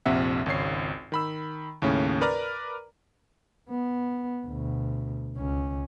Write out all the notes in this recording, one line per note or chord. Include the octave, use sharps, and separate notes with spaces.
A#1 F2 C3 E5 F#5
G#1 C#2 C#5 C7
D#3 B5 E6
D#2 A2 C#3 C#4
A#4 B4 D5 A#5 D6 F6
B3
D2 B2
C#2 C#4